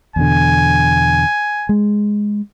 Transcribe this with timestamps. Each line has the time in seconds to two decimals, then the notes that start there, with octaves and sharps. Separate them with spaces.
0.16 E2 B2 D3 G#5
1.69 G#3